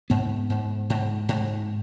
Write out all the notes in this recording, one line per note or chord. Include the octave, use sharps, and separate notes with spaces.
G#2 B3
G#2
G#2
G#2